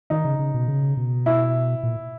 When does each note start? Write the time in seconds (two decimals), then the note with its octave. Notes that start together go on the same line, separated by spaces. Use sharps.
0.10 D#3 D#4
0.25 C#3
0.39 C#3
0.54 B2
0.68 C#3
0.97 B2
1.26 E4
1.83 A#2